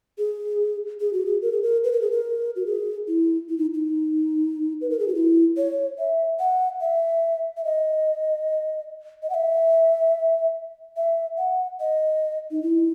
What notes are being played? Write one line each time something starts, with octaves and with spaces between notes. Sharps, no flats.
G#4
G#4
F#4
G#4
A#4
G#4
A#4
B4
A#4
G#4
A#4
F#4
G#4
E4
E4
D#4
D#4
B4
A#4
G#4
F#4
E4
C#5
E5
F#5
E5
E5
D#5
D#5
F#5
E5
E5
F#5
D#5
D#4
E4